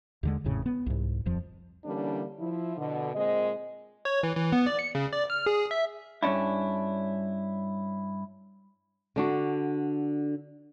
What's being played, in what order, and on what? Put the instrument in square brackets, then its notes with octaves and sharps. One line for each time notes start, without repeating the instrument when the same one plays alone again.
[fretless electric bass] D#2 D3 G#3
G#1 F2 A2 C#3
B3
C2 G#2
D#1 F2 F3
[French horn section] D3 E3 G3 A#3 C#4 D4
F3 E4
B2 D3
A#2 G#3 C4 D#5
[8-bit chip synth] C#5
E3
E3
B3
D5
C#7
C#3
D5
F6
G#4
E5
[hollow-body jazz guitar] G2 A#2 C#4 D4 E4
[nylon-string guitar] D3 D4 F#4